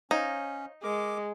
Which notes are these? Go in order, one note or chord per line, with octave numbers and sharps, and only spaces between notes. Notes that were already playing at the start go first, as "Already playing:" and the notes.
C#4 D#4 C5 C#5 F5
G#3 A#4 D6